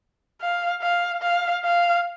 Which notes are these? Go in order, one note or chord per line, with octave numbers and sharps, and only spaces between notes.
F5
F5
F5
F5